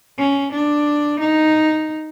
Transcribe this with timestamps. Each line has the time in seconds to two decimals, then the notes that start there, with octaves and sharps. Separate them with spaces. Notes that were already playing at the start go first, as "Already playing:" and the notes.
0.18 C#4
0.52 D4
1.20 D#4